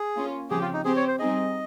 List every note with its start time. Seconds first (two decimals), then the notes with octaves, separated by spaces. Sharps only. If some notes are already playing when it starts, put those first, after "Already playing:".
Already playing: G#4
0.16 A#3 C#4 F4
0.50 C#3 F3 C4 G4 G#4
0.62 F4
0.74 D#4
0.85 C4 G4 G#4 C5
0.96 C#5
1.08 C5
1.19 G3 C4 D#4 G#4 D#5